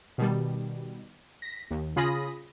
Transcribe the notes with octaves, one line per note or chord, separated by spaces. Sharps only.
B2 D#3 G3
A#6 B6
D#2
C#3 F4 G#4 B5 D#6 A#6